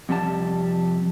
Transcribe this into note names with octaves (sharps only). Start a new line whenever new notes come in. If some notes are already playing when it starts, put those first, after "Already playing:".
F2 C3 G3 F#4 A5